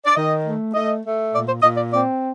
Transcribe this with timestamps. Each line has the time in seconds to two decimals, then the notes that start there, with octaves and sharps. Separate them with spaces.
0.05 D5
0.16 D#3 D#5
0.45 A3
0.74 A3 D#5
1.05 A3
1.33 A#2 D5
1.48 C5
1.62 A#2 D#5
1.77 D5
1.92 C4 D5